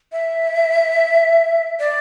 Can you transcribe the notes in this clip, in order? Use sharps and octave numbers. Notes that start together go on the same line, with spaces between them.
E5
D5